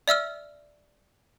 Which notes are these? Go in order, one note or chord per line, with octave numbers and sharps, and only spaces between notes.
D5 E5 E6 F6